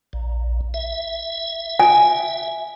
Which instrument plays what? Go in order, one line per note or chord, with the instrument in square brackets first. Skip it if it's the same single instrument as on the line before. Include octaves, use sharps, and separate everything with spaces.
[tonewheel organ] A#1
E5
[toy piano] G#5